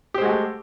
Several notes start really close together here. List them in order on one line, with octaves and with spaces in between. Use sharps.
G4 C5 G#3 F#4 A3